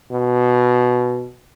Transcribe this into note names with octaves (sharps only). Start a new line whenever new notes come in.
B2